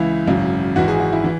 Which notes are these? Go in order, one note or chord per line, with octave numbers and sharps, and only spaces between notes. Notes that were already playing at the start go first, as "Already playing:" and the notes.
Already playing: C#2 C#3 E3 E4
G#1 F#2 C#3
G#1 G#2 E3 F#4
G#4
F#4
E4
E3